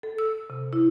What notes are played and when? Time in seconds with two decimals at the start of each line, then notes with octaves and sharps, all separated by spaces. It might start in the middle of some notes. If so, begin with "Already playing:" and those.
0.03 A4
0.18 E6
0.50 C3
0.73 E4